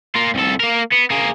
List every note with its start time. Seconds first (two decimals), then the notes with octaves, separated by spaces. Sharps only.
0.16 A#3 F4
0.35 C2 A4
0.60 A#3 A#4
0.92 B3
1.10 A#3 G#4